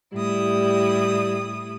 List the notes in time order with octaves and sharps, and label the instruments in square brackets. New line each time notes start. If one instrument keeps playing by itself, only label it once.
[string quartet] A2 E4 D#6 [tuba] G3